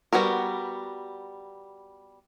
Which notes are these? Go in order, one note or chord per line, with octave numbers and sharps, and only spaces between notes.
G3 B3 F#4 A#4